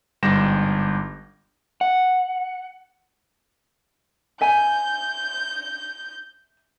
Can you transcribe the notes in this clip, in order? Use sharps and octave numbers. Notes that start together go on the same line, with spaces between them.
G1 G#2 G3 G4 A#6 E7
F#5
E5 G#5 G6